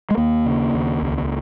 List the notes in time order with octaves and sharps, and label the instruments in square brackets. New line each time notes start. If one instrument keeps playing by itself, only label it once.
[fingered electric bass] G#3
D#2 A#3
C#3
D#2
C#2